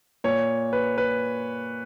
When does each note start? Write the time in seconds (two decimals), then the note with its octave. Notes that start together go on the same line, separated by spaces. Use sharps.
0.24 A#2 C#5
0.73 B4
0.98 B4